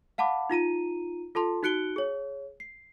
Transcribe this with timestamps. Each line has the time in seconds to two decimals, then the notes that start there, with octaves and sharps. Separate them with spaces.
0.18 F5 F#5 A5 B5 D6
0.50 D#4 F4 A#5 D#7
1.35 F4 A4 A5 C6
1.63 D#4 F#4 F#6 C#7 D7 G7
1.96 G#4 C#5
2.60 C7